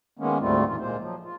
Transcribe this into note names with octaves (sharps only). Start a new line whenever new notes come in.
D#3 G#3 A#3 B3 C#4
D2 G#2 G3 A3 C4 F4
F2 A#2 E3 F4
A#2 G#3 A#3 C5
F3 F#3
F4